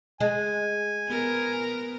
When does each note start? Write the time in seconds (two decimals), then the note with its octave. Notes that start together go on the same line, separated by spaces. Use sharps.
0.20 G#3 G#5
1.09 B3 A#4